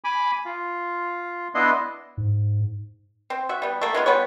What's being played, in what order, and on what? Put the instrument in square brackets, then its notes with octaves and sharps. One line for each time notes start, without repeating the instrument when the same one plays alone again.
[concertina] G#5 B5 D6
F4
B3 D4 E4 D#5 C6
[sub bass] G#2
[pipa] C4
F#4 E5
G3 B3
A3 A#3
G#3 B3 F4
G3 B3 B4 C#5